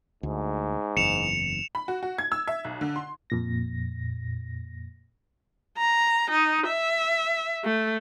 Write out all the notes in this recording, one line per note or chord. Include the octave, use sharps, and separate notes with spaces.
D2 G#2
F#1 E2 C#7 E7 F7
B5
F#4
F#4
G#6
E6
E5
B1
D3
C6
F2 A#2 A#6
A#5
D#4
E5
A3